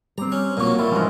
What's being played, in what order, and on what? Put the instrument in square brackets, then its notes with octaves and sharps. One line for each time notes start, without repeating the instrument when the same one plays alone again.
[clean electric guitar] G3 C4 [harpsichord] A#5
[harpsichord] C#4
[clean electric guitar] B1 C#5 [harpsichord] A#2 F#3
[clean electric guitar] G3 E4 [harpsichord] F4 [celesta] A#4
[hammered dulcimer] G#2 E3 G#3 [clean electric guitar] F3 G3 C#4